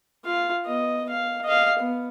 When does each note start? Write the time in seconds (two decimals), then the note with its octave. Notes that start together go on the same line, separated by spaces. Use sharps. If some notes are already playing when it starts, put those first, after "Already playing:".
0.25 F4 F5
0.65 B3 D#5
1.09 F5
1.44 D#5 F5
1.79 B3